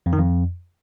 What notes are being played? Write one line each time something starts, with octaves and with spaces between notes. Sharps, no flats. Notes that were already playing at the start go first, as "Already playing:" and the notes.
F2
D#3
F2